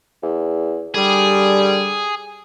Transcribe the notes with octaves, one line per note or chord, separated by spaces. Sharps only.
E2
D3 G3 G#4